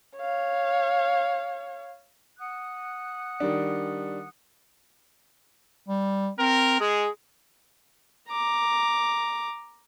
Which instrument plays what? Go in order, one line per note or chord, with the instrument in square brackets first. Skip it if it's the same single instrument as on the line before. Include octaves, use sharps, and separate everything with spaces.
[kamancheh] C#5 F5
[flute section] F#5 D#6 F#6
[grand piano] D#3 G3 D4
[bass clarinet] G3
[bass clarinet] C4 [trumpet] A#4
[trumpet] G#3 [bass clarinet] G#4
[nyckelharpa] A#5 D6